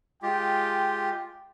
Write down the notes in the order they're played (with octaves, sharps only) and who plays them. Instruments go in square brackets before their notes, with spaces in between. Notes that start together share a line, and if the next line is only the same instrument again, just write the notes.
[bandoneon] G#3 F4 G4 [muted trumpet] G5